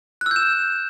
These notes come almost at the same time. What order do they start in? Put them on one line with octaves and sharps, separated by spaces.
F#6 E6 G6 E7